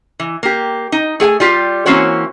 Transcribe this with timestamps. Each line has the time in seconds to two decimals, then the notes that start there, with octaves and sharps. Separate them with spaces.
0.20 E3
0.43 A#3 G4
0.92 D#4
1.20 A3 G#4 F#5 G#5
1.40 G3 F4 G4
1.86 E3 A#3 C4 C#4 F#4 C#5